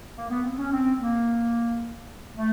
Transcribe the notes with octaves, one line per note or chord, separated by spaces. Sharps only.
A#3
B3
C4
C#4
C4
A#3
A3